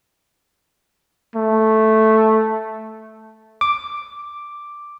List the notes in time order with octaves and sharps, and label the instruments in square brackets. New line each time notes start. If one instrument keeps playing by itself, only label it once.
[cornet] A3
[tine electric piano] D6